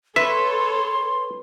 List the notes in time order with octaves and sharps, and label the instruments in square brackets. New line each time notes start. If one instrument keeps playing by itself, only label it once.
[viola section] A4 C#5 [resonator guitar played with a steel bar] B4 [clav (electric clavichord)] E5 [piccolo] C6